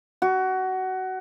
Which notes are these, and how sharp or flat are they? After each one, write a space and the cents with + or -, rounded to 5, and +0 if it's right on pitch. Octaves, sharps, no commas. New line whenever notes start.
F#4 +20